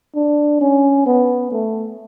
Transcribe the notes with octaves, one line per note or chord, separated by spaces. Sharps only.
D4
C#4
B3
A3